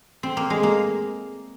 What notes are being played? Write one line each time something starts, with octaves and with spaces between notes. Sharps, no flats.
C4
A#3
G#3
A#3